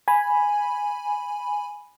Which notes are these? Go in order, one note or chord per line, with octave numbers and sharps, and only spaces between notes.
G#5 B5